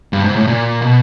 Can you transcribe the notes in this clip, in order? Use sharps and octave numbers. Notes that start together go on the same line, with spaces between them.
G2
G#2
A2
A#2
B2